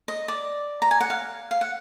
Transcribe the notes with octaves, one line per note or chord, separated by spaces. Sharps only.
D#5
D5
A#5
G#5
F#5
F5
F5
F#5